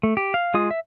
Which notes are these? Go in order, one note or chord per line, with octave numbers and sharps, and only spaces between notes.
A3
G4
F5
G#3 F4 D#6
E5